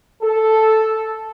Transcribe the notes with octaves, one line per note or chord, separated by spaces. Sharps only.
A4